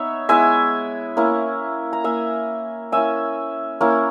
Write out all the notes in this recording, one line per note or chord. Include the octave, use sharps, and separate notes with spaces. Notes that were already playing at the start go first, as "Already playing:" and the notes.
Already playing: B3 D#4 C#5 E5
G#3 B3 E4 E5 G#5
A#3 C#4 E4
A#5
A#3 E4 E5 G#5
A#3 C#4 E4 E5 G#5
A#3 C#4 E4